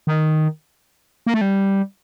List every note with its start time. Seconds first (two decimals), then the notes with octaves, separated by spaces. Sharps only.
0.07 D#3
1.27 A#3
1.34 A3
1.41 G3